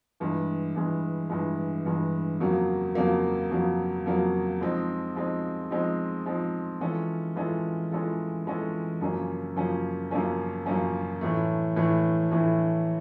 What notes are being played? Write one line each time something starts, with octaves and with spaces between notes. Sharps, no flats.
G2 E3 G#3
G2 E3 G#3
G2 E3 G#3
G2 E3 G#3
F2 C#3 F#3 A#3
F2 C#3 F#3 A#3
F2 C#3 F#3 A#3
F2 C#3 F#3 A#3
F3 G#3 C4 D#4
F3 G#3 C4 D#4
F3 G#3 C4 D#4
F3 G#3 C4 D#4
E3 G#3 C#4 F4 A4
E3 G#3 C#4 F4 A4
E3 G#3 C#4 F4 A4
E3 G#3 C#4 F4 A4
F#2 C#3 F3 A#3 C#4
F#2 C#3 F3 A#3 C#4
F#2 C#3 F3 A#3 C#4
F#2 C#3 F3 A#3 C#4
A2 E3 A3
A2 E3 A3
A2 E3 A3